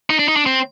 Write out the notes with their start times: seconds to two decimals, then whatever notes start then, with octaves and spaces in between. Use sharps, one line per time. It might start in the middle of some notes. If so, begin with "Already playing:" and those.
0.10 D#4
0.19 D4
0.28 D#4
0.36 D4
0.46 C4